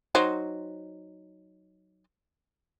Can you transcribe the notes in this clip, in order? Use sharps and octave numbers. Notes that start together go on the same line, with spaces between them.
F#3 D#4 C5